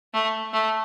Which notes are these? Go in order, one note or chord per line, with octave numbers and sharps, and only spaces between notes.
A3
A3